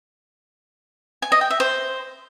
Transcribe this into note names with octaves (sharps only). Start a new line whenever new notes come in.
G#5
D#5
G5
E5
C5